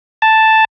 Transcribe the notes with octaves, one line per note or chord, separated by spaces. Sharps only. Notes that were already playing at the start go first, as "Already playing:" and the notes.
A5